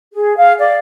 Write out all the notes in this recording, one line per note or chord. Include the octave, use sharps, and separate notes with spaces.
G#4
F5
D5